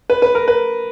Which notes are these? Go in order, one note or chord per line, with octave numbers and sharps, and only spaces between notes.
B4
B4
A#4
B4